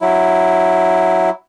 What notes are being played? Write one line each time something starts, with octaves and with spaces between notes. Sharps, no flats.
F#3 E4